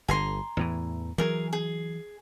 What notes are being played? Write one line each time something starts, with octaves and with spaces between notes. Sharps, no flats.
G1 D3 G#5 A#5 C6
E2 A2 E3
E3 F#3 G#4 A#4
G#4